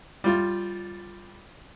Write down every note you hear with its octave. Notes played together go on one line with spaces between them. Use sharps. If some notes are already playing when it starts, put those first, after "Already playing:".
G3 F4